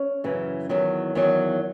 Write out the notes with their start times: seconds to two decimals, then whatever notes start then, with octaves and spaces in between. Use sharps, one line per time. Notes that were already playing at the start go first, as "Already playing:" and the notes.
Already playing: C#4
0.24 F#2 C#3 E3
0.69 E2 D#3 F#3
1.15 E2 D#3 F#3